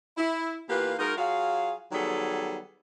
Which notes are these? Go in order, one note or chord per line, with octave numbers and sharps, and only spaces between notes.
E4
E3 A#3 B3 F4 G4 B4
G#3 D#4 F#4 A#4
F#3 F4 F#4 G#4 F5
D#3 F#3 G3 B3 G#4 A4